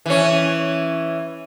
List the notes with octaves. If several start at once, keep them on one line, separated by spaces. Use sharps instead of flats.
E3 C#4